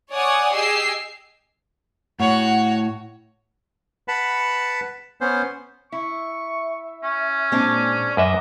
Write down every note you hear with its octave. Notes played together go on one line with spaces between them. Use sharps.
C#5 D5 F#5 G#5 D#6
G4 G#4 D#5 E6 C7
A2 F#4 C#5 F#5
B4 F#5 A5 B5
B3 C#4 C5
E4 E5 C#6
C#4
A#2 G#3 C4 D4
F#2 B4 D#5 E5 D6